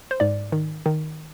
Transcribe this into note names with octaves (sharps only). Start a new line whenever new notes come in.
C5
G#2 D5
D#3
D#3